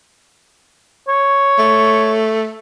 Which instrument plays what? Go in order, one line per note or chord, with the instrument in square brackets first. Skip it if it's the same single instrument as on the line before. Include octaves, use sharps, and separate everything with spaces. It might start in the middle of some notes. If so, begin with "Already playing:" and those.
[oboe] C#5
[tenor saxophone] A3